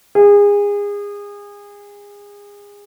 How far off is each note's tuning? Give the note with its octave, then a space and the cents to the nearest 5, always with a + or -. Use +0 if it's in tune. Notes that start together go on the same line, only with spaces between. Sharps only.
G#4 -30